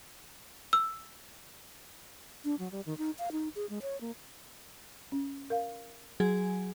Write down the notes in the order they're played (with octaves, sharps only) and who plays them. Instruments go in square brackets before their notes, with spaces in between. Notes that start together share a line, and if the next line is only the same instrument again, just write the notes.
[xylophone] E6
[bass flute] D4
F#3
G3
D#3
D#4
F5
D#4
G#4
G#3
C#5
A#3
[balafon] C#4
A#4 F5
[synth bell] F#3 G#4 G#5